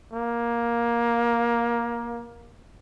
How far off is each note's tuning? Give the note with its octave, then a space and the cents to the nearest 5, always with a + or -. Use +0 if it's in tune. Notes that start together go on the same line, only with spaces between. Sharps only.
A#3 +15